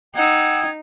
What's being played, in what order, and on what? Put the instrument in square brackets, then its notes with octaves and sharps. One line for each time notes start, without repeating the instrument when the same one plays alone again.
[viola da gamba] D#4 [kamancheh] F#5 E6 [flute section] G5 D#6 G#6